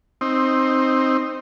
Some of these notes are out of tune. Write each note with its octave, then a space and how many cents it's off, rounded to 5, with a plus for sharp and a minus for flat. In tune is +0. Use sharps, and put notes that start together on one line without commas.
C4 +10 D#4 +0